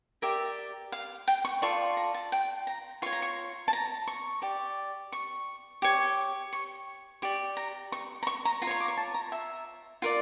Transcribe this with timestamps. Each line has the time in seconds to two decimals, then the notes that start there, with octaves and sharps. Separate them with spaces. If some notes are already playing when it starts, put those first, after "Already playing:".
0.22 G4 A#4 D5 E5
0.92 F5
1.28 G5
1.45 C#6
1.62 F4 A4 D5 C#6
1.97 A#5
2.14 A5
2.32 G5
2.67 A#5
3.02 F4 C#5 C#6
3.13 A#5
3.22 C#6
3.68 A5
3.73 A#5
4.07 C#6
4.42 G4 D5
5.12 C#6
5.82 G4 C#5
6.53 C#6
7.22 G4 D5 C#6
7.57 A#5
7.92 C#6
8.23 A#5
8.27 C#6
8.45 A#5
8.62 F4 A#5
8.67 C#5 C#6
8.80 D6
8.88 C#6
8.97 A5
9.14 A#5
9.32 E5
10.02 F4 A#4 D5